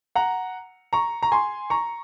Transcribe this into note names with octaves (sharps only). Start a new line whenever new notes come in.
F#5 A#5
A#5 C#6
A#5
G#5 C6
A#5 C#6